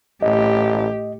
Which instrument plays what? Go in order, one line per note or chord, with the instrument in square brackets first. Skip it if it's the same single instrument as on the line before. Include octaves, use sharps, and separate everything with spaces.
[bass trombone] A1 [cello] A2 G4 [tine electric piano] D#5